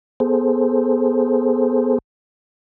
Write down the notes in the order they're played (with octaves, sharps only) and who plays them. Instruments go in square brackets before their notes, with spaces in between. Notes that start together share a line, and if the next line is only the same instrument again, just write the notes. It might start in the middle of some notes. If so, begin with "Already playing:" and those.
[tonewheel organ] B3 G#4 A4 C5